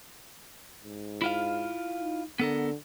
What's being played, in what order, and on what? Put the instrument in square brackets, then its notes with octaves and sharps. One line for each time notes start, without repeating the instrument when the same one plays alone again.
[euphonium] G#2
[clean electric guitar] E4 F4 F5
[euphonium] D#4
[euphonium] D3 [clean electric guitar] B3 A4 A#4